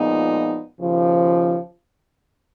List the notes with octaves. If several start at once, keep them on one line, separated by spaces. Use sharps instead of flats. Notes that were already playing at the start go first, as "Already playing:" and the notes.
Already playing: A#2 F3 G#3 B3 D#4
D#2 C#3 F3